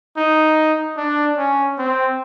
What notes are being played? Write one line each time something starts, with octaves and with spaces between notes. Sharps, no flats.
D#4
D4
C#4
C4